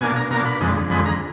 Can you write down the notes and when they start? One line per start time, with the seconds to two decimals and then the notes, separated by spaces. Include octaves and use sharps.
0.01 B2 A#3 D4 G#5
0.16 A#5
0.31 B2 A#3 D4 A#5
0.45 B5
0.60 F2 D3 G#3
0.90 F2 D3 G#3 B5
1.06 A#5